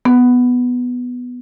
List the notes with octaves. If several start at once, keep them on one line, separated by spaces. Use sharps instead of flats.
B3